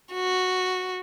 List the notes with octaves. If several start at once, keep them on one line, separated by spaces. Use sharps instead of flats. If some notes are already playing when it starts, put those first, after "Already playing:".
F#4